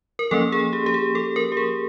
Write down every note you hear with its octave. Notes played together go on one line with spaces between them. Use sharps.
A#4
F3 A#3 C#4 A4
G#4
G4
G4
G#4
A4
A#4
G4
G#4